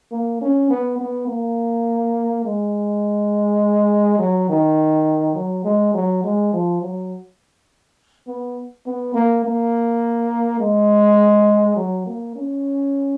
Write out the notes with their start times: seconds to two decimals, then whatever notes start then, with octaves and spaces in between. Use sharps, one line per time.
0.12 A#3
0.41 C#4
0.70 B3
0.98 B3
1.28 A#3
2.45 G#3
4.19 F#3
4.49 D#3
5.35 F#3
5.65 G#3
5.94 F#3
6.24 G#3
6.53 F3
6.82 F#3
8.27 B3
8.86 B3
9.14 A#3
9.44 A#3
10.60 G#3
11.76 F#3
12.07 A#3
12.36 C#4